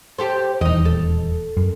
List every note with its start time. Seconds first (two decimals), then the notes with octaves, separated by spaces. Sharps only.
0.19 G4 A4 C5
0.61 D#1 E2 D#4 D#5
0.85 A4
1.57 F#2